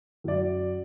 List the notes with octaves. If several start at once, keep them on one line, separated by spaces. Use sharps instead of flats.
F#2 D5